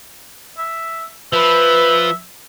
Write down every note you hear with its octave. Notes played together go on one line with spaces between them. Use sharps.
E5
F3 B4 E5